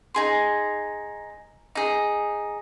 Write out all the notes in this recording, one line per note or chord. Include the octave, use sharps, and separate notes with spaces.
D#4 G#4 C6
D#4 G#4